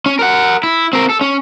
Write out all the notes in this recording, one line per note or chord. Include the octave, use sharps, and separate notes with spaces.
C#4
A#4 F#5
E4
C4 A#4
A4
C#4